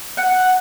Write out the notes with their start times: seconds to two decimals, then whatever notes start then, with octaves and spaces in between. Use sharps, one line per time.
0.17 F#5